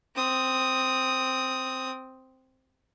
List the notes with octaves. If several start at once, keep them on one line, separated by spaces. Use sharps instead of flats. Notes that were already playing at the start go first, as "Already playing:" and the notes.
C4 D#6